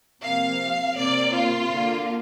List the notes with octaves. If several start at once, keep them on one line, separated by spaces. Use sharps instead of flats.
C3 F3 A#3 F5
C3 A#3 D5
F4
D3 A#3